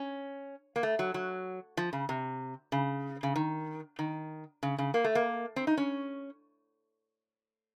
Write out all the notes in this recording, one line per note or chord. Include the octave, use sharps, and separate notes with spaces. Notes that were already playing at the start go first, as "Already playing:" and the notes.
Already playing: C#4
A#3
A3
F#3
F#3
F3
C#3
C3
C#3
C#3
D#3
D#3
C#3
C#3
A#3
A3
A#3
C4
D#4
C#4